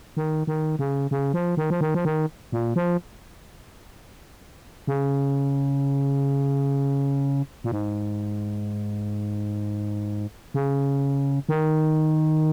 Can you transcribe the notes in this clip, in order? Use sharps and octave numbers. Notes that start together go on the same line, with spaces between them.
D#3
D#3
C#3
C#3
F3
D#3
F3
D#3
F3
D#3
A#2
F3
C#3
A#2
G#2
C#3
D#3